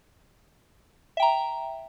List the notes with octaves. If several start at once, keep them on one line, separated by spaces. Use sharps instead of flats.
E5 G5 A#5